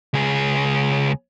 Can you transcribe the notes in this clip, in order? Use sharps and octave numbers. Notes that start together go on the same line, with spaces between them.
C#2 G#4